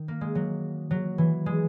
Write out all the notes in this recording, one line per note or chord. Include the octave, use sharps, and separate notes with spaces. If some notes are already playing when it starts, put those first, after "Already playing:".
Already playing: D#3
A#3
G#3
F#3
F#3
E3
G#3